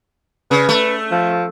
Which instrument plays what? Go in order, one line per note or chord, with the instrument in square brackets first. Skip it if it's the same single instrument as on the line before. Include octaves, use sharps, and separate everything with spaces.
[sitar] C#3 [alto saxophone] B4
[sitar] A3
[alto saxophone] F3